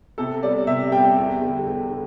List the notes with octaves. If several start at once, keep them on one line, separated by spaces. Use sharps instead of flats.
C3 A4
G3 D5
C3 E5
G3 G5
E2
D3 G3
E2
D3